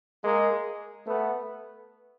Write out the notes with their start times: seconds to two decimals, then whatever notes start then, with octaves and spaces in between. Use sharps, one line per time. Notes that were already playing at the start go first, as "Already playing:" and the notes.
0.23 G#3 A#3
1.06 A3 B3